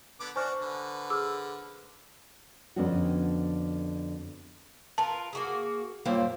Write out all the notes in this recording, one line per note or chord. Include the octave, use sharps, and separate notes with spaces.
D3 B3 D6
D4 F#4 C5 G#5 C#6 F6
D3 B4
G#4 D6 E6 F6
F2 D3 B3 C#4 D4 F#4
F4 A#4 B4 A5
A#3 F#4 G#4
F#2 A#2 G3 A#3 C5